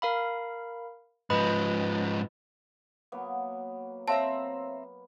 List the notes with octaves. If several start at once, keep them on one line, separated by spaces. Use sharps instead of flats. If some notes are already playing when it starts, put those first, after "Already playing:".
A#4 F5 B5
G#2 F3 B4 D#5 B5
F#3 A#3 B3
C4 C#5 E5 F5 A5 A#5